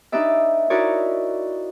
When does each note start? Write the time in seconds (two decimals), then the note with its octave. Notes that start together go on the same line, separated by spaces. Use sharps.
0.12 D4 D#4 G4 B4 D5 E5
0.70 D#4 E4 F#4 A#4 C#5 D5